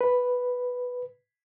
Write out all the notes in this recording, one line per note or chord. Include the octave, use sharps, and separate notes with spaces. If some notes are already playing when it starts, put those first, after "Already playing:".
B4